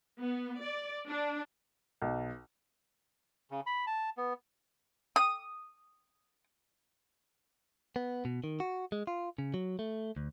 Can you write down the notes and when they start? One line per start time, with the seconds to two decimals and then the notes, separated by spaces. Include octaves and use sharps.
0.20 B3
0.61 D5
1.08 D4
2.02 B1
3.51 C#3
3.66 B5
3.87 A5
4.17 B3
5.16 D#6
7.96 B3
8.25 B2
8.44 D#3
8.60 F#4
8.92 G#3
9.07 F4
9.38 C#3
9.54 F#3
9.79 A3
10.17 D2